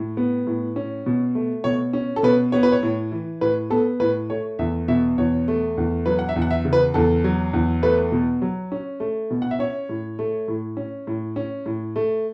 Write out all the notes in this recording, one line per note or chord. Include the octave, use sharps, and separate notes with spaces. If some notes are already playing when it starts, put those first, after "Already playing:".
Already playing: A2
B3
A2
C#4
B2
A3
B2 C#5
C#4
A4
B2 B4
B3 C#5
B4
C#5
A2
E3
A2 B4
B3 A4
A2 B4
A3 C#5
E2 E5
B2 E5
E2 C#5
A3
E2
F#3 B4
F#5
E5
E2
F#5
E5
C#3
B4
E2 A4
F#3
E2
A3 B4
B2
F#3
C#4
A3
B2
F#5
E5
C#4 C#5
A2
A3
A2
C#4
A2
C#4
A2
A3